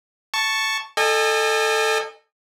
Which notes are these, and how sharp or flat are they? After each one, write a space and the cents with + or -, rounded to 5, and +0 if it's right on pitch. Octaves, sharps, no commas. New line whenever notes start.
A5 +0 C#6 +0
A4 +5 D#5 -25 G#5 -35